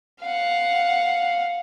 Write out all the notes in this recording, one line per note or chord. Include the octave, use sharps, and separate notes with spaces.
F5 F#5